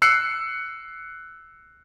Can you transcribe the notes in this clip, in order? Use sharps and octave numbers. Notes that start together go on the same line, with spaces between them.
E6 F#6 C7 C#7